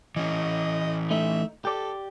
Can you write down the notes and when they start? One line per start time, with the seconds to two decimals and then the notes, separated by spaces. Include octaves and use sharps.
0.16 E3 C#4 D#5
1.11 A3 D#4 E5
1.65 G4 A4 D5